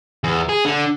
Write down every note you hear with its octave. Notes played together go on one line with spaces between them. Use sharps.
E2
G#4
D3